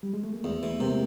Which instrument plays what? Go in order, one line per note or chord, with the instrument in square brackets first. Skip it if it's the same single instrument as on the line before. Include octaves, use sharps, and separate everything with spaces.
[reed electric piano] G3
G#3
A3
A#3
[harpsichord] E2 [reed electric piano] A3 B3
[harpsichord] E3
[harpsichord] C3 [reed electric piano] G#3 A#3